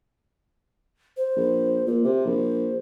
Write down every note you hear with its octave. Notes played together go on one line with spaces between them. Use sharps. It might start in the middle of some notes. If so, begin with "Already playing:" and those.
C5
A#1
A#2 A#3
C3 C5
A#1